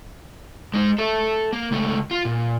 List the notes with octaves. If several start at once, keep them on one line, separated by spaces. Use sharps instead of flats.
G#3 D#4
A4 E5
A#3
C#2 A3
F4
A#2